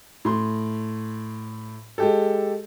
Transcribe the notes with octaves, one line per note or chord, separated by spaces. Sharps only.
A2 C6
G#3 G4 A4